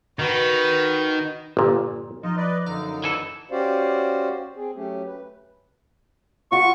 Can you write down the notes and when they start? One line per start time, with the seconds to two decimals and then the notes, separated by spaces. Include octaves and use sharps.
0.19 D#3 F#4 B4
1.57 G1 A#2
2.23 F3 D#4 F4 D#5
2.37 B4 D5 D#5
2.66 F#2 D3 D#4 D5 F5 E6
3.04 E3 A4
3.51 C#4 F#4 G4 C5 D5 F5
4.56 C4 G#4
4.75 F#3 A3 C#4 G4
5.06 B4
6.52 F4 F#4 D#5 C#6